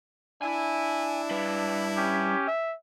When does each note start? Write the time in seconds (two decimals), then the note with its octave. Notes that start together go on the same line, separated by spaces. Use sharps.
0.42 D4 E4 G#5
1.31 G3 B4
1.96 C#4 G4
2.48 E5